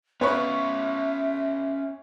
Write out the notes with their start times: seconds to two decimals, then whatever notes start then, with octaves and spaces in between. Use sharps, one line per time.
0.21 B3 C#4 B4 C#5 E5 B5 C#6